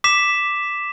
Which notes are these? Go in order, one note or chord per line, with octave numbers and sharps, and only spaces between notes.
D6 B6 E7